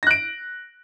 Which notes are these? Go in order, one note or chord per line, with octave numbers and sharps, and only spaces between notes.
F#6 A#6 D7